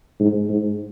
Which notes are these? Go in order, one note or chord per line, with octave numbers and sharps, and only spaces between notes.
G#2
G#2